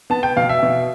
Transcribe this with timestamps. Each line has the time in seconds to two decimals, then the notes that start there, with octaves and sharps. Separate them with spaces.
0.10 B3 A5
0.23 G5
0.37 B2 F5
0.49 E5
0.63 B2